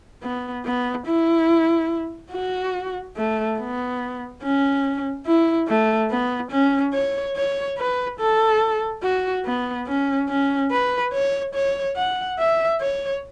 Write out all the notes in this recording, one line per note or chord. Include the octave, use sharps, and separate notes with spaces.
B3
B3
E4
F#4
A3
B3
C#4
E4
A3
B3
C#4
C#5
C#5
B4
A4
F#4
B3
C#4
C#4
B4
C#5
C#5
F#5
E5
C#5